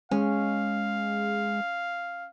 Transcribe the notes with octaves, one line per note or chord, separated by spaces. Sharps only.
G#3 C#4 F5